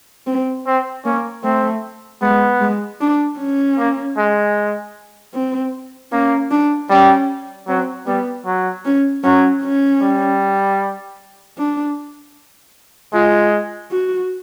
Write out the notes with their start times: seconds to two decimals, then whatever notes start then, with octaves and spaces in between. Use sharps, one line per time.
0.27 C4
0.67 C4
1.05 A#3 C#4
1.44 A3 C4
2.22 G#3 B3
2.61 G#3
3.01 D4
3.39 C#4
3.78 A#3
4.18 G#3
5.34 C4
6.12 A#3 C#4
6.51 D4
6.90 G3 C#4
7.68 F#3 C4
8.07 G3 B3
8.46 F#3
8.85 C#4
9.24 F#3 C#4
9.63 C#4
10.02 G3
11.58 D4
13.13 G#3 F4
13.91 F#4